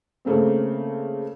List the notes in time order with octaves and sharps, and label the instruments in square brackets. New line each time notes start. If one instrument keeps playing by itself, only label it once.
[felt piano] C#3 A3 A#3 C4